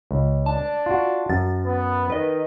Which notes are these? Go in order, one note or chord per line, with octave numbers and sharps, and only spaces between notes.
C#2
D4 A5
F4 F#4
F#2 A6
B3
D#3 B4 D#5